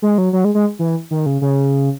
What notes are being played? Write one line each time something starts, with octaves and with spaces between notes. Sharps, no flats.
G#3
F#3
F#3
G#3
G#3
E3
D#3
C#3
C#3